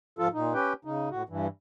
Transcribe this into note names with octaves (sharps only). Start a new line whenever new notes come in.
G#2 F3 F4 A4
A#2 D#4
C#4 G4 B4 G5
C#3 D#4
A2 F#4
G2 E3